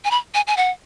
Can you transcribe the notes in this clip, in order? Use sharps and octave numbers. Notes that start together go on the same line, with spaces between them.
G#5
B5
G#5
G#5
F#5